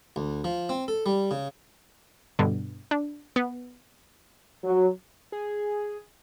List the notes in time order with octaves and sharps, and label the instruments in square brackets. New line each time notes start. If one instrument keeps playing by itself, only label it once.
[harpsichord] D2
F3
C4
A4
G3
C#3
[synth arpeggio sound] G2 B2 D3
D4
B3
[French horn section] F#3
[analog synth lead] G#4